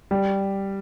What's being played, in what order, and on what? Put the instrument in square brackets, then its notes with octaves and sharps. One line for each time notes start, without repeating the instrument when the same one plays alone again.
[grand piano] G3